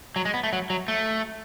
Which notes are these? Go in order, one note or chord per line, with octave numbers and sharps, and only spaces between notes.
F#3
G#3
B3
A3
F#3
F#3
A3